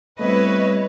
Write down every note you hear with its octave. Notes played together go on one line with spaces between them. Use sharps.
G3 A3 B3 C4 E4 B4 C#5 D#5